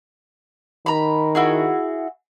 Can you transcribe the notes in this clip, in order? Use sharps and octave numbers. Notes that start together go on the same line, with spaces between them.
D#3 A#5 B5
E4 F#4 G#4